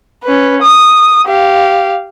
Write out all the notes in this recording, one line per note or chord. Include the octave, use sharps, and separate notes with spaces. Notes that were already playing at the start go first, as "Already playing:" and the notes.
C#4 B4
D#6
G4 F5